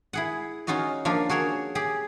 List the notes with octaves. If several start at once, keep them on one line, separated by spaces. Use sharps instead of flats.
E4 G#4 F#5
C#4 D#4 F4 F#4 D#5
F3 A#3 D4 F4
F#4 G#4 A#4 C#5
G4 G#4